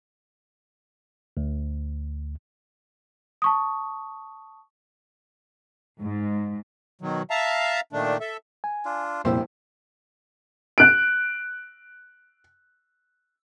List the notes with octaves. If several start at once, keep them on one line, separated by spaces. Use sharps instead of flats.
D2
A5 C#6 D#6
G#2
B2 D#3 F#3
E5 F5 A5 A#5
A#2 D#3 A3 D4
A4 E5
G#5
D4 F4
C2 F2 A#2 A#3 E4 G4 C5
F#6 D7